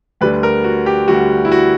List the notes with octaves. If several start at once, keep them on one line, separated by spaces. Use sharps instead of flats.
D2 D3 G3 B4
A#4
F#4
G4
D2 D3 G3 F#4
E4
F#4